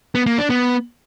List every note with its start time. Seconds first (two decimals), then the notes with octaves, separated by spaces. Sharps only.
0.15 B3
0.26 A#3
0.38 D4
0.50 B3